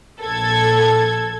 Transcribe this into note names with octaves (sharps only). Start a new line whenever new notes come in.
A#1 A4 G#6